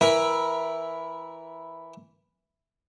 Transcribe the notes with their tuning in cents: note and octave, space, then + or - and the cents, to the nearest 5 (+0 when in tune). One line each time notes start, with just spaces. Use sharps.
E3 +0 E4 +0 A#4 +20